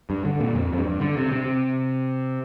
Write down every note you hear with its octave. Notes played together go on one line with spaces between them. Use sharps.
G2
D3
A#2
F2
F2
G2
D3
C3
C3